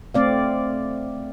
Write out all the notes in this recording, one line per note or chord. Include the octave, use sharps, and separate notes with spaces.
A3 C4 D5 F5